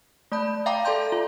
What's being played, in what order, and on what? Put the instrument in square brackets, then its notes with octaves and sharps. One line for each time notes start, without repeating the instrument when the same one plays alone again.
[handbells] A3 D5 A5 B5 G6
E5 F5 G5 A#5 D6
A4 D5 A5 C6 G6
F4